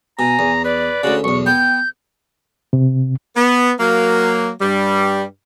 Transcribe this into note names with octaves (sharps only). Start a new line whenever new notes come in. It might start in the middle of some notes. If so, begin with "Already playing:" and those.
B2 G#5 A#5
E2
B4 D5
D2 C#3 F#4
B1 E2 C#6
B3 G5 G6
C3
B3
F#3 A#3
G2 G3